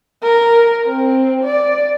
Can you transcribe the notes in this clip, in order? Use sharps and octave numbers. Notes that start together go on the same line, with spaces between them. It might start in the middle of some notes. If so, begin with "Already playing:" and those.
A#4
C4
D5